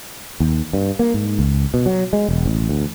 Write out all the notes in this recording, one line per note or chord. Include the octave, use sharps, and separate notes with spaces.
D#2
G2
A#3
G#2
C#2
B2
F#3
G#3
E1
A1
D2